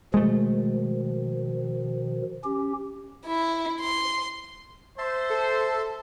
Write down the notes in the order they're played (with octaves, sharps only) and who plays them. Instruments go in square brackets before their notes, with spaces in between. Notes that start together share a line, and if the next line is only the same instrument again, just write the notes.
[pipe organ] B2 D#3 F3 [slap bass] G#3 A3
[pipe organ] C#4 G4
[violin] E4
C6
[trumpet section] C5 [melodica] E5 A5 C6
[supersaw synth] A4